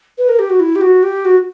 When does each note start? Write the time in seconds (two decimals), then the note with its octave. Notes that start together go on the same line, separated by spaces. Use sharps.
0.18 B4
0.28 A#4
0.39 G4
0.49 F#4
0.59 E4
0.75 G4
0.81 F#4
1.02 G4
1.24 F#4